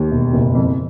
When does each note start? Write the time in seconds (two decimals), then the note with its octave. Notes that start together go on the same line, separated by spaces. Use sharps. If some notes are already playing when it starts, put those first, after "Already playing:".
Already playing: D#2
0.12 E1
0.33 F#1
0.55 F2